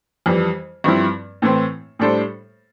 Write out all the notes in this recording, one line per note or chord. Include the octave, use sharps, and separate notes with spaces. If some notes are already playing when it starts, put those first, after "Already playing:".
F2 E3 G3
G2 F3 C4 E4
A2 E3 A3 C4
A2 G3 D4 A4 C5